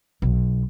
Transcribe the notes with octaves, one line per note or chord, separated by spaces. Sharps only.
B1